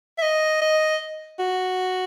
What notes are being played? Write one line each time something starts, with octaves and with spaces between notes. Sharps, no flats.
E5
D#5
D#5
F#4